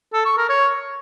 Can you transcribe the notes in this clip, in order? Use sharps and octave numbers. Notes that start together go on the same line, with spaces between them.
A4
C#6
A#4
C#5